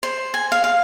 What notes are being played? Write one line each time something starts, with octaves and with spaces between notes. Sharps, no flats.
C5
G#5
F5
F5